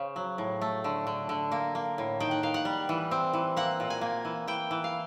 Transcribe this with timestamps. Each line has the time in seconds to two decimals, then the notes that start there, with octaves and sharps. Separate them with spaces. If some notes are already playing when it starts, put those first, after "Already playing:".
Already playing: C#3 C5
0.16 F#3
0.38 A2
0.61 A3
0.84 D3
1.07 D3
1.29 D3
1.52 A#3
1.75 A#3
1.98 A2
2.20 D#3 G5
2.31 F#5
2.43 D#3 F5
2.54 F#5
2.65 G3
2.89 E3
3.11 C4
3.33 E3
3.56 A#3 F#5
3.80 A#2
3.90 G#5
4.01 A#3
4.25 E3
4.47 E3 G5
4.71 E3
4.84 F5